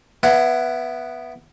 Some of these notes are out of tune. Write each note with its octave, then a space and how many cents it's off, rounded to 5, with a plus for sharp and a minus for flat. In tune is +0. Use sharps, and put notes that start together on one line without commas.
B3 +0 E4 +20 F#5 +0